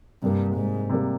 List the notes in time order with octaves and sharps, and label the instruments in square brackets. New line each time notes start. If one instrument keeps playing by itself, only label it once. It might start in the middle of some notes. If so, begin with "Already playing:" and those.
[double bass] G2 [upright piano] C3 G3 A#3
[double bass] G#2
[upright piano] C3 G3 A#3